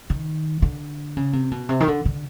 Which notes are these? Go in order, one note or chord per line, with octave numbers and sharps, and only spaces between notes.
D#3
D3
C#3
C3
B2
C3
D#3
D3
D3